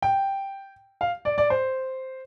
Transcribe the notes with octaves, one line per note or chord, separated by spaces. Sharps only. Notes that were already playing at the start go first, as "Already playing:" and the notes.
G5
F5
D5
D5
C5